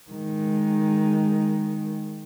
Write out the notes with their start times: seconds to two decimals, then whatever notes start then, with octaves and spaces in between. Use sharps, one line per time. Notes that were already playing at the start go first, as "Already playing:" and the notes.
0.10 D#3 G#3